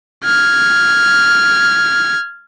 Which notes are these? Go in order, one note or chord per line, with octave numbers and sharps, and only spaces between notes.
F6 G#6